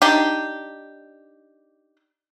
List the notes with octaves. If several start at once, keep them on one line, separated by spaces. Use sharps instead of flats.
D4 D#4 G4